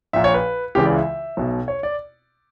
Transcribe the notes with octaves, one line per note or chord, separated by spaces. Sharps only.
A#1 A#2 E5
C#5
B4
C#2 C#3 E3 G4
D5
E5
B1 B2
C#5
D5